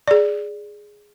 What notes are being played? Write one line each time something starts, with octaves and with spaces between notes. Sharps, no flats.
G#4 D5